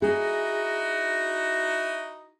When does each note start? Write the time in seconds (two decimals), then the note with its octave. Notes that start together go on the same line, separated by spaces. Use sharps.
0.02 D#4 E4 F#4 G#4